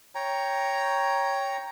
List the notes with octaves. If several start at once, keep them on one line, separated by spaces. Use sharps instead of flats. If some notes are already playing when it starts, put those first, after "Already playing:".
C#5 G5 A#5